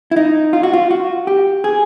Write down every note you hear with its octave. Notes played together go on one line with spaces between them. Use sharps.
E4
D#4
F4
F#4
F4
F#4
G4
G#4